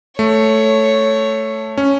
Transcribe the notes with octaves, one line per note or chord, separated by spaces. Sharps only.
A3 C#5
C#4